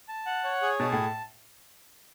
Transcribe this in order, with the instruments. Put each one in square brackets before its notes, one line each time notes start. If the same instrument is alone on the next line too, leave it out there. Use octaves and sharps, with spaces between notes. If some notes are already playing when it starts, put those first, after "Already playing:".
[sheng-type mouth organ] A5
F#5
C#5
G#4
[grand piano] B2 [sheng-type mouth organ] A5
[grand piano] A2